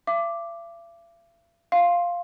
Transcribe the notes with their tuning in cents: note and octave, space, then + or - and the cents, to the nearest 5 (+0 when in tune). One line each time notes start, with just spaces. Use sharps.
E5 +45 D6 +0
F5 +0 C6 +15